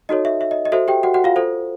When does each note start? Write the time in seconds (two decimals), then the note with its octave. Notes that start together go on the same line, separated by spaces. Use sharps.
0.09 D#4 F#4 A4 C#5 D#5
0.25 E5
0.41 E5
0.51 D#5
0.65 D#5
0.72 F#4 A4 C5 E5
0.88 G4 G5
1.03 F#4 F#5
1.14 F#4 F#5
1.24 F4 F5
1.36 F4 A4 C5